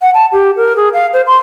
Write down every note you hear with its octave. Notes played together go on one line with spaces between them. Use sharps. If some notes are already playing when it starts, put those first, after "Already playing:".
F#5
A5
G4
A#4
G#4
F5
C5
C6